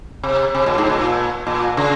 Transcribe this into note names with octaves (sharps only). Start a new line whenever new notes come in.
C3
C3
A#2
G#2
A#2
A#2
C#3